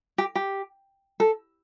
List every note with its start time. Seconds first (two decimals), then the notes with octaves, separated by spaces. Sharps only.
0.18 G4
0.35 G4
1.20 A4